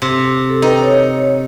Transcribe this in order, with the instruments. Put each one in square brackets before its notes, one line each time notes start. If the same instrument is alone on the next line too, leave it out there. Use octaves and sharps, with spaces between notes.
[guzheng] C3
[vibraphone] A4
[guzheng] D#4 [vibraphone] A4 B4 G5
[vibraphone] C#5